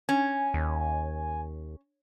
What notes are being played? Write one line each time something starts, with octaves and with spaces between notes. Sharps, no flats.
C#4 G#5
D#2